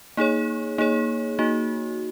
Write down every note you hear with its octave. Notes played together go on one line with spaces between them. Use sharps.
A#3 D#4 G#4 C#5
A#3 D#4 G#4 C#5
A#3 D#4 F#4